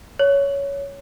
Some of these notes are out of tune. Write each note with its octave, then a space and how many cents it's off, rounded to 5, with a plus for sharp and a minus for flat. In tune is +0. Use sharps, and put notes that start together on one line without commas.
C#5 +15